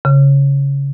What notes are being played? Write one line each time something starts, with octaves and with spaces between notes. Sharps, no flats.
C#3